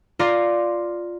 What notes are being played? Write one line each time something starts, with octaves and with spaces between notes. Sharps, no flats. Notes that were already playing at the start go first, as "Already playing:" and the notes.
F4 D5 A#5 C6